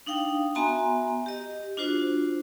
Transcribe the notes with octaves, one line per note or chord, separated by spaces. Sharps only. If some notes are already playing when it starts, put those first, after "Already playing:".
D4 D#4 F5 G5
B3 F#4 E5 G#5 A#5 C6
G4 D#5
D4 F4 F#4 C5